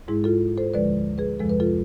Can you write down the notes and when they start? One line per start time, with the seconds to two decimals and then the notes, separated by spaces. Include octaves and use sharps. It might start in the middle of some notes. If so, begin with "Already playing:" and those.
0.08 G#2 G#3 E4 G#4
0.24 F4 A4
0.58 A4 C5
0.74 D2 D3 F3 G#3 B4 D5
1.18 G#4 B4
1.40 F2 C3 F3 G#3 A4
1.49 B4
1.60 F4 A4